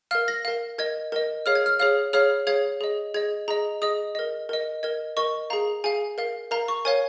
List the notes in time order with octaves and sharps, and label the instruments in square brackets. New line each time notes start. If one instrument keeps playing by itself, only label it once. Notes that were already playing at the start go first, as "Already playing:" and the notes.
[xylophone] A#4 F5 F6
A#6
A#4 F5
A#4 D#5 G#6
A#4 D#5
G#4 C#5 F5 F6
G#6
F6
G#4 C#5 F5 F6
G#4 C#5 F5 F6
G#4 C#5 F5 G#6
G#4 D#5
G#4 D#5 G#6
G#4 D#5 A#5
G#4 D#5 D#6
A#4 D#5
A#4 D#5
A#4 D#5 G#6
A#4 D#5 C#6
G#4 F5 A#5
G#4 F5 G#5
A#4 F5
A#4 F5 A#5
C#6
A#4 C#5 F5 G#5